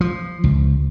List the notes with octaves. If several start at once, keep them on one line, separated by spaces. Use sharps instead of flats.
F3
C#2